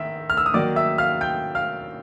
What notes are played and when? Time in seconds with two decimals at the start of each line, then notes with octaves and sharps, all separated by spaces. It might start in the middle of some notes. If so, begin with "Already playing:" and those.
Already playing: D#3 E5 E6
0.30 F6
0.37 E6
0.46 D#6
0.54 D#3 F#3 A#3 D5 D6
0.76 E5 E6
0.98 F5 F6
1.21 G5 G6
1.55 F5 F6